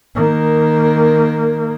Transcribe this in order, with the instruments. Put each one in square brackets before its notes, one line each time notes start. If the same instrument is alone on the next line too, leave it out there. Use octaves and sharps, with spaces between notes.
[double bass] D#3 A#3